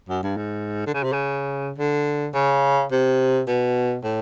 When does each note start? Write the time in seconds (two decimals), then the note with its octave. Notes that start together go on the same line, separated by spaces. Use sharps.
0.09 F#2
0.23 G2
0.37 G#2
0.87 D3
0.94 C#3
1.04 C3
1.13 C#3
1.78 D3
2.34 C#3
2.92 C3
3.48 B2
4.04 A2